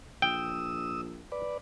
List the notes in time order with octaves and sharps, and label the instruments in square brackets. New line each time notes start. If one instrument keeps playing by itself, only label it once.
[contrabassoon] A#1 [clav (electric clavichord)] G5 [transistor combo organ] D#6 E6
[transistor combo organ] B4 D5